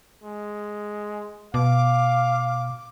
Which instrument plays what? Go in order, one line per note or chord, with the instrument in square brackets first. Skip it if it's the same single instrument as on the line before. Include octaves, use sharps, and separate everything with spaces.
[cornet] G#3
[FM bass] B2 [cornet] F5 [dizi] D6